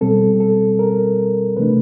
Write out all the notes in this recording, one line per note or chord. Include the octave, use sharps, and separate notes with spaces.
B2 G3 C4 A4
A4
A#4
C3 E3 A3 D4 B4